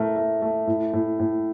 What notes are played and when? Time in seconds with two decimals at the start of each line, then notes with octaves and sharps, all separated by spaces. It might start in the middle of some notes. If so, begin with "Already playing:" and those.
Already playing: A2 A3 A#4
0.16 A3
0.42 A3
0.67 A2
0.93 A2
1.20 A2